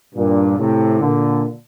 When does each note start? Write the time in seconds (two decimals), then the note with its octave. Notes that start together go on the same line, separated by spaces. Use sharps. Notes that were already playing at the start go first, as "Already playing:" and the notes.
0.15 G2 A#2
0.58 A2 C3
1.01 A#2 D3